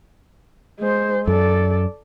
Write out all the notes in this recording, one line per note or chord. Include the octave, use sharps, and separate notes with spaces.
G#3 C5
F#2 A4 D5